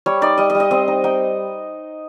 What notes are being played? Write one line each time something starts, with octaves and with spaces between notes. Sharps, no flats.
G3 C#5
D#4 D5
G3 D#5
D#5
G3
D#5
C4 D#5
D#4
D#4 G5